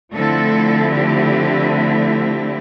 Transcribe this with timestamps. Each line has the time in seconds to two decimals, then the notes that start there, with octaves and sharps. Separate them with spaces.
0.13 D3 F3 A3 C4 E4 A4
0.94 G4
1.74 G4